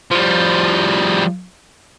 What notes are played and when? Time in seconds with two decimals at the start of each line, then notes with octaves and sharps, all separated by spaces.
0.11 F3 G3